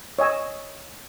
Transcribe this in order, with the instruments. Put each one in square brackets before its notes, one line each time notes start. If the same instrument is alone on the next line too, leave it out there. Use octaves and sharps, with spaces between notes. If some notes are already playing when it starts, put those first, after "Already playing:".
[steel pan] C#5 D#5 G#5 E6